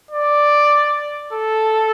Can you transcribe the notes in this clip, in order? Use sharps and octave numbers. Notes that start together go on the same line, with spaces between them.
D5
A4